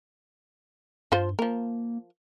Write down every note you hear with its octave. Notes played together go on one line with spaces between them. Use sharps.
G2 F3 F4 C5
F3 A#3 A#4